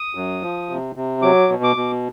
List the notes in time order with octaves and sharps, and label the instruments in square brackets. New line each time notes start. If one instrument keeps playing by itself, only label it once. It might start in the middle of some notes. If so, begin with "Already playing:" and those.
Already playing: [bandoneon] D#6
F#2
F3
C3
C3
F#3 D6
B2
D6
B2